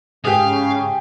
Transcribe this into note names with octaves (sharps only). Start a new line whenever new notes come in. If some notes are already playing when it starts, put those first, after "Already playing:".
G#2 C#3 G4 G#4 F5 D#6